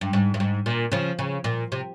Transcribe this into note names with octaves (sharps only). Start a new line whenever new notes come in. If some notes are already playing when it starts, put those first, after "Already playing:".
G2
G#2
G2
G#2
A#2
C#3 F3
C#3
A#2
C3